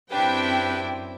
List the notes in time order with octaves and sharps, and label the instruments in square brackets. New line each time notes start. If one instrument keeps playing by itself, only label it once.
[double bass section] F#2 C4 [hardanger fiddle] D4 E4 [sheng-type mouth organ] G4 B4 [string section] G5